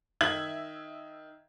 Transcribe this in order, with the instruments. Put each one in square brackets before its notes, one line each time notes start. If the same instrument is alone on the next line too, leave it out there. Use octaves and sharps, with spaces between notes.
[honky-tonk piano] D#3 E5 G#6 F#7